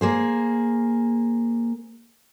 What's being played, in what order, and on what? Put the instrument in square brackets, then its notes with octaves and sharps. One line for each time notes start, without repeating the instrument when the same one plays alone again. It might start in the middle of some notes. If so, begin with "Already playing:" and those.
[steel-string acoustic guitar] A#3 G#4 C5